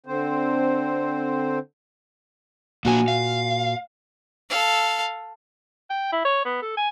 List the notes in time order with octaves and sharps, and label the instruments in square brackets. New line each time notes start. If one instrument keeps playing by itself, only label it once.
[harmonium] D3 C4 C5
[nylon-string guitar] A#2 F#4 G#5 [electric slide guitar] A#3 D4
[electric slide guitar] F5
[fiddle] A4 F5
[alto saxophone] G5
E4
C#5
B3
A4
G#5